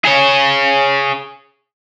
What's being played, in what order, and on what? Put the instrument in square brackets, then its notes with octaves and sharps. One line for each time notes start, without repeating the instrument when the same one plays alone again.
[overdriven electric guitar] G#4 C#5